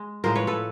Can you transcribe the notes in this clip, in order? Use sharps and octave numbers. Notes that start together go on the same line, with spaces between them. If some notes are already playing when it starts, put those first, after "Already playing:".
Already playing: G#3
A2 F3 G#3 A#4 C5
B4 C#5
A4 B4